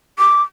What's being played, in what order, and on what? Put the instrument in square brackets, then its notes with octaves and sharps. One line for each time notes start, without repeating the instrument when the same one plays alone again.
[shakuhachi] D6